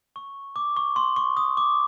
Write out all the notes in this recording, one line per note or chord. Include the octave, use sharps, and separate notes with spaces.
C#6
D6
C#6
C6
C#6
D#6
D6